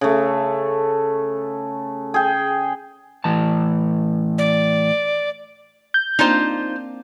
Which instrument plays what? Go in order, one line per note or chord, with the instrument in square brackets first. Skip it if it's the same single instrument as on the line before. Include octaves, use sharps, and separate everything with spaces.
[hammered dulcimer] C#3 A3
G#4 G5
[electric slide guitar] A2 E3 A5
[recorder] D5
[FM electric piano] G6
[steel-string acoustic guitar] A#3 C4 D4 [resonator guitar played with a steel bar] D#4 F4 C5